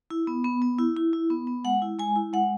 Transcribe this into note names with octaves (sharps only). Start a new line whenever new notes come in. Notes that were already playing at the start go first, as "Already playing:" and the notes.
E4
B3
B3
B3
E4
E4
E4
B3
B3
G#3 F#5
E4
G#3 G#5
E4
G#3 F#5